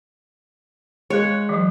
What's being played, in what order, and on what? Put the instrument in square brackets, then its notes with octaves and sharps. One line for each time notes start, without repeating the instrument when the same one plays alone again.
[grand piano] G#3 F5 F#6 [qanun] C#5
[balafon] E3 F#3